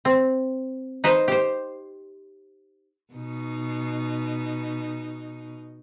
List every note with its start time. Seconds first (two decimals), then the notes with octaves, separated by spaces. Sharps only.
0.05 C4
1.04 D#4 B4 C5
1.28 G4 C5
3.14 B2 D#4